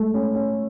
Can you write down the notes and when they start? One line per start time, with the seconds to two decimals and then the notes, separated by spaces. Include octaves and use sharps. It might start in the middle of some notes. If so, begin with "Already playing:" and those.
Already playing: A3
0.14 C#4
0.35 C#4